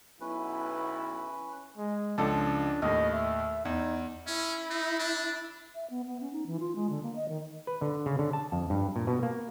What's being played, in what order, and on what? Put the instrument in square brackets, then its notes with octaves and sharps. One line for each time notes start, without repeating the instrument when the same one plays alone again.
[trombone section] B1 B2 E4 [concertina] C#4 B4
[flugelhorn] G#3
[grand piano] C#2 F3 A4 [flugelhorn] D4
[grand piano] D#2 A2 [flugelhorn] D#5
[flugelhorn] E5
[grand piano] E2 [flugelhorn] D#4
[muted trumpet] C#4 [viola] E4
[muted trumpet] D#4
D4
[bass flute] E5
B3
B3
C#4
D#4
E3
F4
G#3
D3
A#3
D#5
D#3
[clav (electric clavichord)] B4
D3
C#3
D3
A5
F2
G2
A#2
B2
A#3